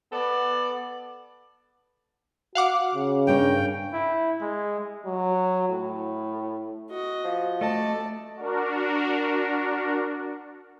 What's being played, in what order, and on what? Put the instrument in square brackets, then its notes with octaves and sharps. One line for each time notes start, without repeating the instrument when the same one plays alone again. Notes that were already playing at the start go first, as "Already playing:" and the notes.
[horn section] B3 A4 D5
[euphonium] F#4 [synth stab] F5 F#5 D6
[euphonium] C#3
[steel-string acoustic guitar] G2 A#4 C#5 [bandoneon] G5
[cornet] E4
G#3
[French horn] F#3
A2
[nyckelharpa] F#4 D#5
[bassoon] F3
[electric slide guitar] A3 D#5 [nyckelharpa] D5 [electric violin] A5
[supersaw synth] D4 F#4 A#4